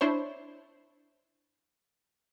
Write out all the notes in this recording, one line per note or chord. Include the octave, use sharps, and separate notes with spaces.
D4 E4 C5 C#5